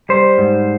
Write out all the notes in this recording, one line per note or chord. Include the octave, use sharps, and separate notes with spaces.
G3 C5
G#2